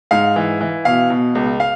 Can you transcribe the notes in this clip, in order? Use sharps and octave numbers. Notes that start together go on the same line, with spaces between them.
G#2 F5
E3
E3
B2 F5
B2
C#2
F5